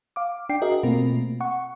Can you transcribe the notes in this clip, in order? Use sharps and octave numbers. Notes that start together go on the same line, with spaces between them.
F5 D6
D4 G5 C7
F#4 G#4 A#4 D#5 E5
B2 A3 A#3 C4 F4 A#4
F#5 C#6